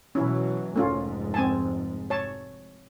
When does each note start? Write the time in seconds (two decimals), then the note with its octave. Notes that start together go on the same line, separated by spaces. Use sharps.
0.15 B2 E3 F#3 C#4 E4
0.76 F1 G#2 A3 C#4 F4
1.34 C4 G#5 A5
2.10 C#5 A5